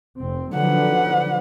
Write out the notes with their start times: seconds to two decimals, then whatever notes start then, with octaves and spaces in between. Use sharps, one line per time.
0.19 F1 C4
0.54 D3 F3 F#3 B4 F#5